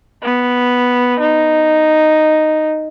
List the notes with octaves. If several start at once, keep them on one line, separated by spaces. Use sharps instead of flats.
B3
D#4